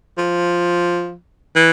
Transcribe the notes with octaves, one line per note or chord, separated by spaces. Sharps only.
F3
E3